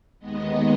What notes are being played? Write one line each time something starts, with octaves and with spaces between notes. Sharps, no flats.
D#2 D#3 G#3 B3 D#5